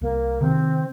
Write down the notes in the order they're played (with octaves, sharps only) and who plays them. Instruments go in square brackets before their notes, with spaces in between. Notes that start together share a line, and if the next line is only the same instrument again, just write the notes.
[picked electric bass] C2 [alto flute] A#3
[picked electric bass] C3 D#3 [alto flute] C4